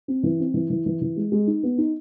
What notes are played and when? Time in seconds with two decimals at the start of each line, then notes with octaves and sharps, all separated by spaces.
0.08 C4
0.23 E3
0.40 C4
0.54 E3
0.70 E3
0.86 E3
1.01 E3
1.16 G#3
1.32 G#3
1.47 D#4
1.63 B3
1.78 D#4